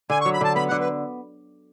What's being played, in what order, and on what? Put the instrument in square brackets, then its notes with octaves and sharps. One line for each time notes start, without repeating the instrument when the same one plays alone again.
[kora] D3 [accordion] G#5
[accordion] C#6
[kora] F#3
[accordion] B5
[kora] D3 [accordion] A5
[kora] B3 [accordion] B5
[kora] D3 [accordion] F#5
[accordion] B4